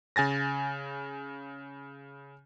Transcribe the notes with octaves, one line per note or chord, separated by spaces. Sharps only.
C#3 G#5 A6 A#6